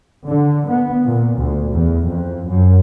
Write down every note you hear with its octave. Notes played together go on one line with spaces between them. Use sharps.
D3
B3
A#2
D2
E2
F2
F#2